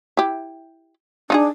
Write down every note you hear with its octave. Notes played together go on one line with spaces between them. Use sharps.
E4 G4
D4 D#4 F4 G#4